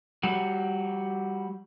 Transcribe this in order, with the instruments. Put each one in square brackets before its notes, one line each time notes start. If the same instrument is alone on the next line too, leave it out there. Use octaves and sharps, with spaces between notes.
[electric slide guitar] G3 F#4